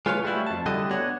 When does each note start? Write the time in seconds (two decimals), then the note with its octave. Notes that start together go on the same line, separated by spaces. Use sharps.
0.06 G#3 F4 B4 C#5 F5
0.25 G3 A3 E4 F#4
0.47 F2 A5
0.66 A2 D3 G3 F#4 A4 D#5
0.91 B3 D4 F#4 C#5 F#5